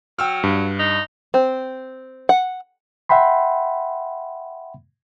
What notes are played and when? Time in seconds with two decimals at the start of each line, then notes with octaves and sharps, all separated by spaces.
0.19 F#3 G5 E6 F6
0.43 G2
0.79 D#4
1.34 C4
2.29 F#5
3.09 E5 F#5 G5 B5 C6